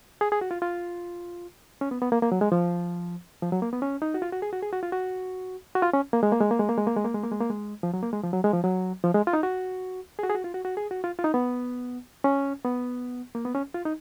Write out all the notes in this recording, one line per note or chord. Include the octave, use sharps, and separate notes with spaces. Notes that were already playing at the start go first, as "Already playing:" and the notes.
G#4
G#4
F#4
F4
F4
C#4
B3
B3
A#3
A#3
F#3
G#3
F3
F3
F#3
A#3
B3
C#4
D#4
F#4
F4
F#4
G#4
F#4
G#4
F#4
F4
F#4
F#4
F4
C#4
A#3
G#3
A#3
G#3
A#3
G#3
A#3
G#3
A#3
G#3
A#3
G#3
A#3
G#3
A#3
G#3
F3
F#3
A#3
G#3
F3
F#3
G#3
F3
F#3
F3
G#3
F4
D#4
F#4
G#4
F#4
G#4
F#4
F4
F#4
F#4
G#4
F#4
F4
F4
D#4
B3
C#4
B3
A#3
B3
C#4
F4
D#4